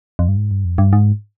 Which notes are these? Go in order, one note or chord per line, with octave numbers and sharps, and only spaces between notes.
F2
G2
G#2
G2
F2
G2
G#2